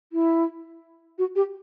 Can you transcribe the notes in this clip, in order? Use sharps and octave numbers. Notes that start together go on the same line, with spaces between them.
E4
F#4
G4